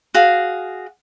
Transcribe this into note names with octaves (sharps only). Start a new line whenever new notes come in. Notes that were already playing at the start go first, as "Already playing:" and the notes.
F#4 G#4 F5